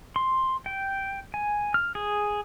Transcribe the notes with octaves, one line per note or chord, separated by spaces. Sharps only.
C6
G5
G#5
F6
G#4